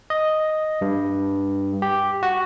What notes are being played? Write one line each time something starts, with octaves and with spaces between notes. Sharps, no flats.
D#5
G2
G4
F#4